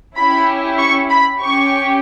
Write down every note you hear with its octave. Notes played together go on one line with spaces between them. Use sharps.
C#4 E4 G4 B5
C#6
B5
C#4 G4 C#6